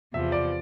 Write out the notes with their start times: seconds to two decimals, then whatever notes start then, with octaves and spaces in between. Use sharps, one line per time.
0.14 E2 C3 F3 E5
0.32 D5